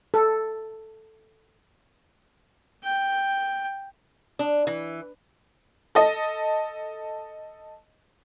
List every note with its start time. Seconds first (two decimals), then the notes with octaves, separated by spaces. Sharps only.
0.14 A4
2.84 G5
4.39 D4
4.67 E3
5.95 A4 D#5